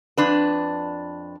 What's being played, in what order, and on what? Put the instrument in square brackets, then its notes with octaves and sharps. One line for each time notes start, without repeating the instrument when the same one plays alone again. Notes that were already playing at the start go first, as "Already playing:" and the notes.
[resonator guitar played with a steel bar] F2 D4 B4